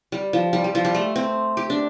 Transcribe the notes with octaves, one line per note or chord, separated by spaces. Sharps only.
G3
F3
G3
G3
F3
G3
A3
C4
G4
D4